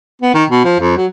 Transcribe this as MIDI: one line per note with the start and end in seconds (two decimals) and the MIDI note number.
0.22 0.34 59
0.34 0.44 51
0.50 0.64 47
0.65 0.76 53
0.80 0.95 41
0.97 1.06 54